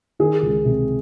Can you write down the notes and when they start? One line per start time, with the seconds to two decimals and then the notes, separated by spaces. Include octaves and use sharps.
0.19 D#3 G#4
0.42 C#2
0.65 C3